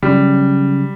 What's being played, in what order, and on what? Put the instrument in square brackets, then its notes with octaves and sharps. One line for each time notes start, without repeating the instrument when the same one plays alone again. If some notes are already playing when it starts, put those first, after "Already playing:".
[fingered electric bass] C#3 F#3 C#4 [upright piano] G3